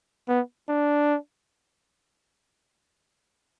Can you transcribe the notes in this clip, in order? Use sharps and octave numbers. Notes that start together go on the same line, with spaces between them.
B3
D4